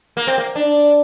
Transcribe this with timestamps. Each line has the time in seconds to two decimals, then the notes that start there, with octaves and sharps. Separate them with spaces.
0.17 A#3
0.27 C4
0.38 A#3
0.55 D4